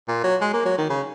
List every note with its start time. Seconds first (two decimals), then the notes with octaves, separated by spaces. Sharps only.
0.08 A#2
0.24 F#3
0.41 G#3
0.53 A#3
0.65 F#3
0.78 D#3
0.90 C#3